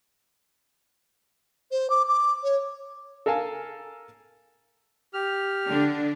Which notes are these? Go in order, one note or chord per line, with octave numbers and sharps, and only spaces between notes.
C5
D6
D6
C#5
A4 A#4 F5 G#5 A5
G4 F6
D3 D4